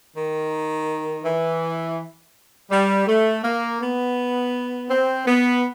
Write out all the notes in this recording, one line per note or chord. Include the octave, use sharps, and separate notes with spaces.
D#3
E3
G3
A3
A#3
B3
C4
B3